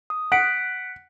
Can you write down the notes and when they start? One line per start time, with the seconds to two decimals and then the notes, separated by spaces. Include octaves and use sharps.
0.10 D#6
0.32 F#5 F#6 B6 D7